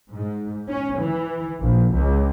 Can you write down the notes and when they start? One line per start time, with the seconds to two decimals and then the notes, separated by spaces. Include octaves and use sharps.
0.11 G#2
0.68 C#4
1.01 E3
1.60 A#1
1.95 C#2